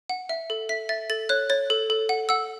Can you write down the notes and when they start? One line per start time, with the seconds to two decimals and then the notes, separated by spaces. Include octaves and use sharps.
0.10 F#5
0.29 E5
0.50 A4
0.69 E5 B6
0.89 E5 A6
1.10 A4 A6
1.29 C#5 F#6
1.50 C#5 A6
1.70 A4
1.90 A4
2.09 F#5
2.29 F#5 E6